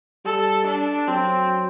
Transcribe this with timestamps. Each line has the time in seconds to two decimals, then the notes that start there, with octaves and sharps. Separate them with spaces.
0.25 G3 A4
0.67 D4
1.07 F#3 C4